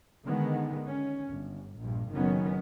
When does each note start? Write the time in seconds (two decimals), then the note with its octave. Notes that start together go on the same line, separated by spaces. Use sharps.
0.25 D3 D#3 G#3 B3
0.86 C#4
1.28 G1
1.78 A#1 G2
2.13 F#1 D#3 F#3 B3 C#4